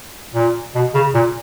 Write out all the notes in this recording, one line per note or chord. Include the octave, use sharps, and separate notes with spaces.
A#2
B2
C#3
A#2